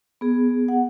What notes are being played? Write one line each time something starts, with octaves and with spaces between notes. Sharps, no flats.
B3 G#4
B3
F#5